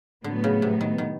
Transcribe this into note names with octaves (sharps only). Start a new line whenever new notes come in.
A2 D3 F#3 B3
C#3
C3
D#3
D#3